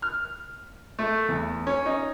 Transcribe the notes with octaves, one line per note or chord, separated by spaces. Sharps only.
F6
A3
E2
C#4
D#4